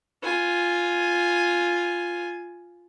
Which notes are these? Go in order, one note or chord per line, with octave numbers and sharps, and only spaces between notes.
F4 G#5